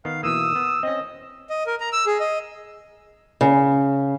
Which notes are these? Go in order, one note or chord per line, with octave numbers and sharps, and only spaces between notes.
D#3 B3 F5
B2 E3 A#3 D#6 E6
B3
C4 C#4 D#5
D#5
A#4
A#5
E6
G#4
D#5
C#3